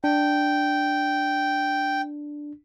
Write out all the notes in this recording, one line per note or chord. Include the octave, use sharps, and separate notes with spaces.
D4 G5